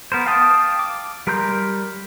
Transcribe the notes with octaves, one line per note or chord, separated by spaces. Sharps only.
B3 A#4 C5
F5 G5 A5 D#6
D6
G3 A#4 A#5 C6 G6